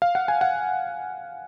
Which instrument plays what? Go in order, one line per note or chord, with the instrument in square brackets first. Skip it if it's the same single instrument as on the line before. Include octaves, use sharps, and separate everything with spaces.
[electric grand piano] F5
F#5
G#5
F#5